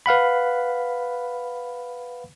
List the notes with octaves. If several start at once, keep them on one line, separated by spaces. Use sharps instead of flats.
B4 F5 F#5 B5